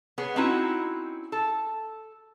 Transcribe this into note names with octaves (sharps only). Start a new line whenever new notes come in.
B3 G#4 C#5
C4 C#4 D#4 E4 F#4
A4